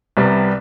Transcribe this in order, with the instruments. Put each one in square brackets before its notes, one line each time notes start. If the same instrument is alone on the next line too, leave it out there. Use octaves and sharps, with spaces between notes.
[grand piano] C2 C3 G3 B3